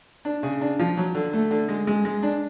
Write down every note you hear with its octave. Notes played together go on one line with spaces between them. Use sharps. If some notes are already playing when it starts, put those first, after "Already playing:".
D4
C#3
D4
F3
F#3
D3
A3
D3
G#3
G#3
G#3
D4